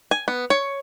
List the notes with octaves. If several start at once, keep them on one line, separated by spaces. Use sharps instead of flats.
G#5
B3
C#5